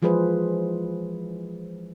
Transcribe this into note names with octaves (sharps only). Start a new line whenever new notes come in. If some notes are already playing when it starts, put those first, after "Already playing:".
E3 F3 G#3 G#4 B4 C5